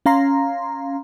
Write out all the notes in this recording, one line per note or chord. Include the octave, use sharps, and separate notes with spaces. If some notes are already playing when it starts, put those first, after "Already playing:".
C#4 F5 A#5 C6